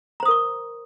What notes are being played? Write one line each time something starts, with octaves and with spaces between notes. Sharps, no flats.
A#4 C5 A#5 C#6 D#6